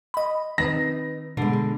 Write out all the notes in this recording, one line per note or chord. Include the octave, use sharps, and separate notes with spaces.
D#5 B5
D#3 C4 D#4 B4 A#6
B2 D3 G#3